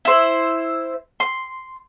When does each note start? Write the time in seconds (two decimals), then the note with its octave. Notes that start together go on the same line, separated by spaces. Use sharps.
0.05 E4 C5
1.20 C6